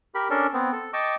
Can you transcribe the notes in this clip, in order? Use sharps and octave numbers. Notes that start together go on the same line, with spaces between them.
G4 A#4 B5
C#4 D4 A4 A#4
B3 C4
A4
D#5 G5 A5 C#6 D6